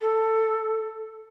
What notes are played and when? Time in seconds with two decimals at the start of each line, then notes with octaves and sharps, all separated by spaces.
0.01 A4